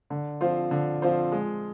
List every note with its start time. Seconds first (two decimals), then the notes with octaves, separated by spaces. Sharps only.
0.10 D3
0.41 F3 C4 F4 C5
0.71 D3
1.02 F3 C4 F4 C5
1.32 G#3